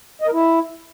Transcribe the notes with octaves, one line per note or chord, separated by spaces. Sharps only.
D#5
A#4
E4